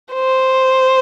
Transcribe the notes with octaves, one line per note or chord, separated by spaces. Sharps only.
C5